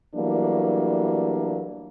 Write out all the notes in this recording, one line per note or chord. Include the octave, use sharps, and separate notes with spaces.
E3 F#3 G3 A3 A#3 D4